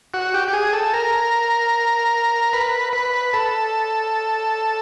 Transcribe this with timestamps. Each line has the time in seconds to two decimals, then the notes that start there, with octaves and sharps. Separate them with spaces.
0.14 F#4
0.34 G4
0.48 G4
0.53 G#4
0.73 A4
0.94 A#4
2.53 B4
2.93 B4
3.33 A4